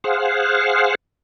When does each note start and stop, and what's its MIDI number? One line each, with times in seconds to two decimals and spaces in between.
0.04 0.95 68
0.04 0.95 72
0.04 0.95 77
0.04 0.95 78